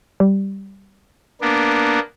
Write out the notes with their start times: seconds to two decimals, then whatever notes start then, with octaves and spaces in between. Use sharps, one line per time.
0.20 G3
1.41 A#3 B3 D4